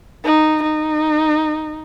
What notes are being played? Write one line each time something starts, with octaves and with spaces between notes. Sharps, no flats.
D#4
D#4